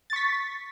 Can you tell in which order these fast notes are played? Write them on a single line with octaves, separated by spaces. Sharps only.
A6 C#6 B6